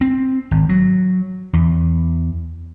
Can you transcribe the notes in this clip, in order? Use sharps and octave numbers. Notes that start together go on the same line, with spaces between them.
C4
G#1
F#3
E2